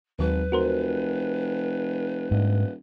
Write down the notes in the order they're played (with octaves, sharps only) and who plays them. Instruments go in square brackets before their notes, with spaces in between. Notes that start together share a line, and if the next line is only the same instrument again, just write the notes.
[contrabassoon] G#1 [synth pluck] D#2 F#3 [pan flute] B4
[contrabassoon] F1 [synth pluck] F#4 A#4 C5
[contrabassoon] D#1 [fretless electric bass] G#2 D4